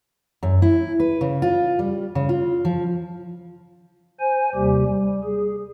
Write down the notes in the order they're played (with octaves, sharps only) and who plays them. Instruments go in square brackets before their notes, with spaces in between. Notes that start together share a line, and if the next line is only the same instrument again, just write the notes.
[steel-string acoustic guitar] F#2
E4
B4
C#3
F4
G3
C#3
F4
F3
[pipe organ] C5 G#5
D#2 C3 G3 G4
G3
G#4